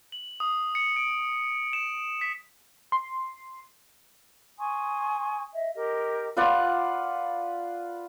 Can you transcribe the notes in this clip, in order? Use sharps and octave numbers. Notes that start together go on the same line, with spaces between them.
F#7
D#6
C#7
D7
E7
B6
C6
G#5 C6 C#6 D#6
D#5 E5
G4 A#4 D#5
F4 B4 D5 F#5